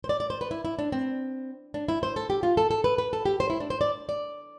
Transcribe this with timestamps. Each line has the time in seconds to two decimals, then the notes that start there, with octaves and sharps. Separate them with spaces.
0.04 C5
0.09 D5
0.20 D5
0.30 C5
0.41 B4
0.51 E4
0.65 E4
0.79 D4
0.92 C4
1.74 D4
1.88 E4
2.03 C5
2.16 A4
2.30 G4
2.43 F4
2.57 A4
2.71 A4
2.84 B4
2.98 B4
3.13 A4
3.25 G4
3.40 C5
3.50 E4
3.60 D4
3.70 C5
3.81 D5
4.09 D5